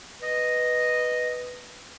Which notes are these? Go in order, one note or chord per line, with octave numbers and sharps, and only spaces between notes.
B4 D#5